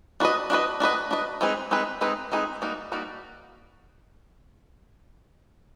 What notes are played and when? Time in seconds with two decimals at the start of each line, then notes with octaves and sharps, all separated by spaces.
0.20 D4 F#4 B4 D#5
0.50 D4 F#4 B4 D#5
0.80 D4 F#4 B4 D#5
1.11 D4 F#4 B4 D#5
1.41 G#3 C4 D#4 G#4 B4
1.71 G#3 C4 D#4 G#4 B4
2.01 G#3 C4 D#4 G#4 B4
2.32 G#3 C4 D#4 G#4 B4
2.62 G3 A#3 D#4 F#4
2.92 G3 A#3 D#4 F#4